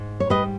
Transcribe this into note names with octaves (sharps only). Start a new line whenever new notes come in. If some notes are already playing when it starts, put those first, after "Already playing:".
Already playing: G#2
C#5
G3 B4 D#5